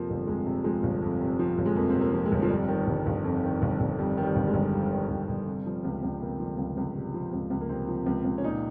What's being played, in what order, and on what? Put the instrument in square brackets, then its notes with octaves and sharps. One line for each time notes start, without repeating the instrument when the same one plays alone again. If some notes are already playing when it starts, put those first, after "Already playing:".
Already playing: [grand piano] F2 C3 F3 A#3
G1
F2 G#3
C3
F3 G#3
G1
F2
C3
F3
G1
G#3
F2 A#3
C4
C3
A#3
F3
G#3
G1
F3
F2 G3
D#3
G1
G1
F2
D#3
G1
G1
F2 G3
D#3
G3
G1
G#3
G1
F2 G3
D#3
G1
G1
C3
F3
C#2
C#2
C3 A#3
F3
C#2
C#2
C3
F3
C#2
C#2
A#3
C3 C4
F3
C#2
C#2
C#4
A#2 D#4